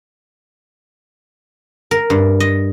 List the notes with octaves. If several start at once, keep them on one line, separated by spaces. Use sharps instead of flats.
A#4
G2
D#5